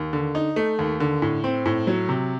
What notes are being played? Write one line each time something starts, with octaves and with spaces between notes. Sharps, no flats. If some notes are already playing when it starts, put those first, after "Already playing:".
Already playing: D#2
D3
D#4
A3
D#2
D3
A2
C4
A2
F#3
C3